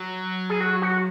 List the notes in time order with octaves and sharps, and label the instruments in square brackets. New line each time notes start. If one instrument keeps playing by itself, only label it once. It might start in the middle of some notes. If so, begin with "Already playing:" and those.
Already playing: [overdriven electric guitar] F#3
[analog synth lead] G#4
F#4
F#4